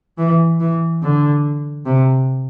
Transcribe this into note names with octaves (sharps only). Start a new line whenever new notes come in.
E3
E3
D3
C3